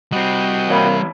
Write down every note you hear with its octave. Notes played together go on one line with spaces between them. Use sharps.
G3 C4 F#4 D#5 G5
E3 A#3 C#5 B5